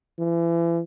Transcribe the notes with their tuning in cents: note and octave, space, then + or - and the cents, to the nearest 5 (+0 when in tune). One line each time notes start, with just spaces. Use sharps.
E3 +35